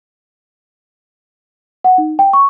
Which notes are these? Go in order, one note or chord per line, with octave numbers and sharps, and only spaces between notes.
F#5
D#4
G5
C#6